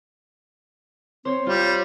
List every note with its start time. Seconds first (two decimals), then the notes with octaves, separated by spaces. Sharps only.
1.25 C4 C5 C#5
1.46 G3 F4 C#5